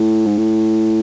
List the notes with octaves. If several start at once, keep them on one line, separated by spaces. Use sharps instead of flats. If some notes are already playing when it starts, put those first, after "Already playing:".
Already playing: A2
G#2
A2